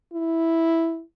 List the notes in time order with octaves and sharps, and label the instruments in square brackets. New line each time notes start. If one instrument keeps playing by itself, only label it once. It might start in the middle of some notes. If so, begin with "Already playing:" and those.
[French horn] E4